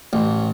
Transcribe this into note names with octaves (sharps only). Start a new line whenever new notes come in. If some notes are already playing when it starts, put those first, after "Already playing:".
A1